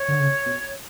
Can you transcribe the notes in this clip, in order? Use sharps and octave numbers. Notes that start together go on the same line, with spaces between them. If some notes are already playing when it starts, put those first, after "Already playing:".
Already playing: C#5
D3
C#3
B2